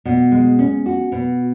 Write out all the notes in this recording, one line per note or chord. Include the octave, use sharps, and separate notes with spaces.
B2
G#3
C#4
F#4
B2